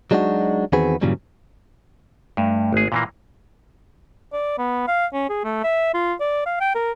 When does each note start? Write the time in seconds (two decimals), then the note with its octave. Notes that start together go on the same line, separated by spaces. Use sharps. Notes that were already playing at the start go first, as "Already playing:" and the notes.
0.11 F#3 G#3 D4 D#4 F#4
0.72 E2 D#3 C4 F#4 G#4 B4
1.01 G2 A#2 C#3 E3 F#3 G3
2.37 G2 A3
2.73 G#1 G#4
2.92 A#2 E3 A#3
4.33 D5
4.58 B3
4.87 F5
5.13 C#4
5.29 G#4
5.44 A3
5.63 E5
5.94 F4
6.20 D5
6.46 F5
6.60 G5
6.75 A#4